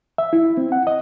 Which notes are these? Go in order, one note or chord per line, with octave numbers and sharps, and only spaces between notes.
E5
E4
C4
F#5
D#5